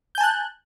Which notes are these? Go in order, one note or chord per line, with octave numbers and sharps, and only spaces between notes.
G#5 A5 F#6 G6